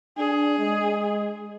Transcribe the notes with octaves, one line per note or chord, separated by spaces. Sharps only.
D4 G#4
G#3